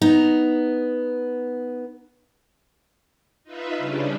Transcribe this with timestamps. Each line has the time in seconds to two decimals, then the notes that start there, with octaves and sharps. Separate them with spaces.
0.02 B3 D#4 A#5
3.44 D#4 F4 B4 E5
3.78 C#3 G3 C#4 D4